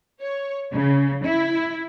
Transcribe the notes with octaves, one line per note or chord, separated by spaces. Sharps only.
C#5
C#3
E4